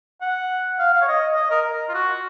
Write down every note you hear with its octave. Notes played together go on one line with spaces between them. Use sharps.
F#5
F5
F5
C#5
D#5
D#5
A#4
F4
F#4